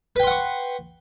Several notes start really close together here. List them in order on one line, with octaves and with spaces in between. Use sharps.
B4 G5 C6 F#5 C#6